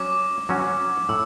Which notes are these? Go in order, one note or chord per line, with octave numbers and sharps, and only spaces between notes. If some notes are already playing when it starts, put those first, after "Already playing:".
Already playing: F#3 C#4 F#4 D6
F#3 C#4 F#4
A2 E6